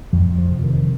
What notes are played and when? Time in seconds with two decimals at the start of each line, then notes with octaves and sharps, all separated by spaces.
0.13 F2 F3
0.38 F3
0.51 C3
0.64 D#3